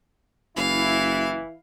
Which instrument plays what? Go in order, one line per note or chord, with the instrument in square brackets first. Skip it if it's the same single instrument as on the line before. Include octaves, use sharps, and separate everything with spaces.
[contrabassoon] F#1 [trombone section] E3 E4 [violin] F5